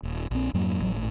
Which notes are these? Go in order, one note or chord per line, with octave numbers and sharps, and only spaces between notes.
D#1
A#1 C4
F2 G#2 F#3 A#3
A1 F#3
G#1 A2